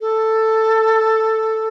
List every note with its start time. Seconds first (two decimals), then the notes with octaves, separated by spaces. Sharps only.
0.01 A4